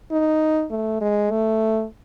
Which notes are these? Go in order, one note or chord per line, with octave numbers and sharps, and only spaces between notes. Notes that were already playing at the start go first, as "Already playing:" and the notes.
D#4
A3
G#3
A3